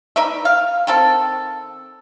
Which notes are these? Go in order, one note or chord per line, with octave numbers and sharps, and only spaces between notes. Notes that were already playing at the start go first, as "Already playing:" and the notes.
D#4 B4 D5 E5
F5
D#3 C4 A4